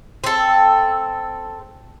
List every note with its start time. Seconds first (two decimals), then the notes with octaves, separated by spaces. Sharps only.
0.24 C4 A4